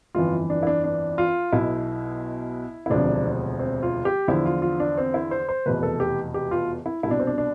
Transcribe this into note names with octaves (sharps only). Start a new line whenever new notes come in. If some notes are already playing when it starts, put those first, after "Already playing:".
G1 F2 E3 F4
D4
E4
D4
D4
F4
B1 B2 E4
E4
E1 D2 C3 F3 D4
C4
C4
F4
G4
E2 D3 F3 E4
F4
F4
D4
C4
E4
C5
C5
F1 E2 B2 B4
A4
G4
G4
F4
E4
C2 B2 D4 E4
C4
D4
D4